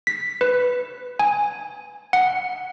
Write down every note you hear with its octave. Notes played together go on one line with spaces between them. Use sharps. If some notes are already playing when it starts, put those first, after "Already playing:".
B6
B4
G#5
F#5